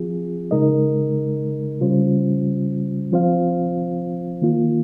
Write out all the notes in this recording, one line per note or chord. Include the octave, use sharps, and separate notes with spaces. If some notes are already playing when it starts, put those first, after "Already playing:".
Already playing: F3 C4 F4 G#4
C#3 G#3 D#4 A#4 D#5
C#3 G3 C#4 F4 C5
F3 C4 F4 C5 F5
D#3 A#3 F4